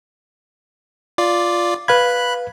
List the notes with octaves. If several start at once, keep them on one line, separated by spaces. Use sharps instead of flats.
F4 D5
B4 F5 B5 F#6 G#6